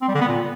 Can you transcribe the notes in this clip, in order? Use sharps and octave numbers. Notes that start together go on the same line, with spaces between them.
C4
G3
D3
B3
A#2